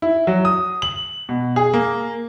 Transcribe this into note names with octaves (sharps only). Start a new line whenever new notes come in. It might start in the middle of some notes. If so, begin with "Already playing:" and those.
E4
F#3
D#6
F#7
B2
G#4
A#3